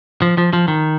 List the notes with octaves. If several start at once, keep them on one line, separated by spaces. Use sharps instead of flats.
F3
F3
F3
D#3